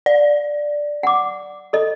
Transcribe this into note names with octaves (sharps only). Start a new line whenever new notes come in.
D5
F#5 D6
A4 D#5